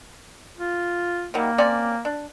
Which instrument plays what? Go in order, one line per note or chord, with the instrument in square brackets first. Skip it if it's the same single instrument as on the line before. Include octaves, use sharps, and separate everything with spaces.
[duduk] F4
[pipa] D#3 F#3 G3 [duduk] A#3
[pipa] C4 C#4 D5
D4